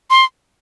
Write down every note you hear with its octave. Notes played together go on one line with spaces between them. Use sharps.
C6